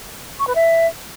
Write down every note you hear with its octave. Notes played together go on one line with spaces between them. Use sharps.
C#6
B4
E5